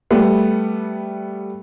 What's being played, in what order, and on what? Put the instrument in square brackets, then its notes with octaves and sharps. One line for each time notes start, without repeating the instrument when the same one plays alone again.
[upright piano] G3 A3 B3